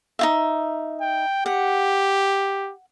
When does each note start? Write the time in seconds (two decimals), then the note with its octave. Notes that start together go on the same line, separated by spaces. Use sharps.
0.19 D#4 F4 E5
1.01 G5
1.46 G4 F#5